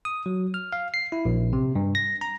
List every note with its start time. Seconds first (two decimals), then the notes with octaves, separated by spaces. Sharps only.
0.05 D#6
0.26 F#3
0.54 F6
0.73 F5
0.94 C7
1.12 E4
1.25 A#1
1.53 C3
1.75 G2
1.95 A#6
2.21 A#5